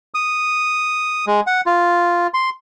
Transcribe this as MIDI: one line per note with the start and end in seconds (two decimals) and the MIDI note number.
0.14 1.25 87
1.27 1.41 56
1.47 1.61 78
1.66 2.27 65
2.34 2.50 84